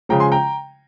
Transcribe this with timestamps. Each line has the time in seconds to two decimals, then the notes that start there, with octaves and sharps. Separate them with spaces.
0.09 C#3 F3 G#3 G5 A#5
0.20 G#5 C6
0.32 G5 A#5